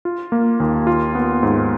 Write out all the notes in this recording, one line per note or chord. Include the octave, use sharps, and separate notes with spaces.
F4
A#3
D#2
F4
B3
G#2